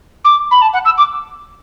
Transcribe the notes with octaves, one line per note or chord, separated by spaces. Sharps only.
D6
B5
A5
F#5
E6
D6